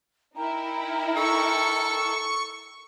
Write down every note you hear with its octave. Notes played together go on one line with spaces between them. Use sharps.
D#4 E4 A#4 G5 A#5
A4 C#6